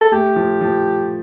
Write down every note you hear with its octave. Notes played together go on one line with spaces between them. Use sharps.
A4
A3 G4
F3
F3